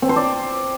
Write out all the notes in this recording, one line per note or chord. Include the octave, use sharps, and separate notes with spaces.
C4
C5
D5